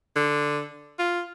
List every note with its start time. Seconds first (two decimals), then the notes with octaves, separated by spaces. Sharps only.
0.16 D3
0.99 F4